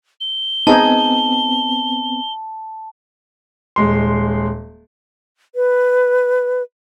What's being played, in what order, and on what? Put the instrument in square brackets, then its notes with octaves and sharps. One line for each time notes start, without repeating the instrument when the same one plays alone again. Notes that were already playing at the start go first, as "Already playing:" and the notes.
[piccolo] G7
[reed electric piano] B3 C4 [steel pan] D#4 G#4 [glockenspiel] A5
[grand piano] D#1 G#3 C6
[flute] B4